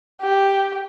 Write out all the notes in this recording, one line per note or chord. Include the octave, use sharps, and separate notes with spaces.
G4